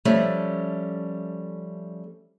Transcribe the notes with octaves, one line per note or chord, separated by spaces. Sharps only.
F3 G3 A3 C#4